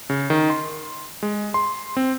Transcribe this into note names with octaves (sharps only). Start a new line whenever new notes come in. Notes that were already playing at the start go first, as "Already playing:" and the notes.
C#3
D#3
C6
G#3
C6
C4